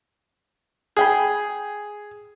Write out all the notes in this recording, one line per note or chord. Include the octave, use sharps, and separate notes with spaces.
D4 G#4 G5 B5